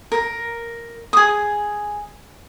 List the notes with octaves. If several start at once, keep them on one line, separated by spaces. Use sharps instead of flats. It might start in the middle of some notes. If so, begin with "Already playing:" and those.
A#4
G#4 D#6